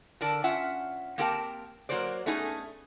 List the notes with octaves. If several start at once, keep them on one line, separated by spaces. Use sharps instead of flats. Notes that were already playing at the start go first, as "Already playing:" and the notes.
D3 A#4 D5 A5
C#4 F4 E5 F#5
A#3 C4 G4 A#4 G5 A5
F#3 A#3 A#4 C5 D5
A3 B3 C#4 D#4 G#4